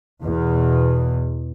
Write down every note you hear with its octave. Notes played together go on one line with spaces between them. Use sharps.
E2 B2